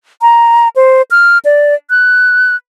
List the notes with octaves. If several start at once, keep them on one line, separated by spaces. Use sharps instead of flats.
A#5
C5
F6
D5
F#6